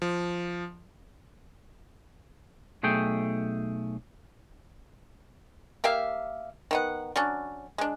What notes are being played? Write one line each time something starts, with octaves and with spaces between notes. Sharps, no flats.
F3
B1 A3 G#4 G5
A#3 G4 E5 F5
D#3 B3 F#5
F#3 C#4 D4
G#3 D4